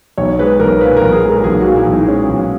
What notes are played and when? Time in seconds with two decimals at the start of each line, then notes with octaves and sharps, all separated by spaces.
0.18 B1 C#5
0.39 G#3 B4
0.60 B1 A#4
0.81 A#2 B4
0.97 A#4
1.02 B1
1.12 G#4
1.23 G#3
1.29 A#4
1.44 B1 G#4
1.61 A#2 F#4
1.76 E4
1.86 B1
1.92 D#4
2.07 G#3 C#4
2.28 B1